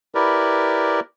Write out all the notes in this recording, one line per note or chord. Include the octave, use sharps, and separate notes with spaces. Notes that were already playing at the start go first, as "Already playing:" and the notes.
E4 G4 A#4 B4 D5